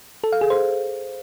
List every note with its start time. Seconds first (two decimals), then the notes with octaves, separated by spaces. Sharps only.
0.24 A4
0.32 F5
0.41 G#4
0.50 C5